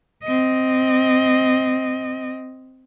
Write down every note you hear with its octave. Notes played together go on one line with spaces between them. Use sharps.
C4 D#5